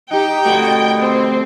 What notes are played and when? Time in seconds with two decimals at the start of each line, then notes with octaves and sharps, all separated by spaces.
0.11 D#4 G4 G5
0.45 D2 B2 G3 A3 F#4
1.00 C4